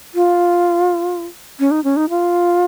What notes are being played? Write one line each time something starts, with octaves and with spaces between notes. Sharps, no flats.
F4
C#4
D#4
C#4
D#4
F4